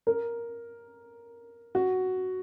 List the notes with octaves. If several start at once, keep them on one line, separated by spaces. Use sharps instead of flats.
A#4
F#4